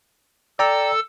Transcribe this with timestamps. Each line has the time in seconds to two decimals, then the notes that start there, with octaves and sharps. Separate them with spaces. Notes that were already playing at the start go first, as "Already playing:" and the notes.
0.59 A4 D5 G5 A#5 E6